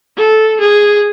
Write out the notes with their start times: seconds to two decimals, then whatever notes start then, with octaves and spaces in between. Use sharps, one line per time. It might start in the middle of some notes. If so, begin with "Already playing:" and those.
0.17 A4
0.60 G#4